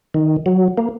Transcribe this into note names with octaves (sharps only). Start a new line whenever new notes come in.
D#3
F#3
A#3